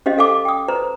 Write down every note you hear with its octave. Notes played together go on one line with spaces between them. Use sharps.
C#4 G4 C5 D#5 F5
A4 F5 G#5 D6
G5 D#6
B4 C5 A#5